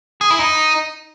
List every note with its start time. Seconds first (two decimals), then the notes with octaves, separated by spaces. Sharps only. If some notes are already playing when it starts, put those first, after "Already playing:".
0.21 G#4
0.30 E4
0.40 D#4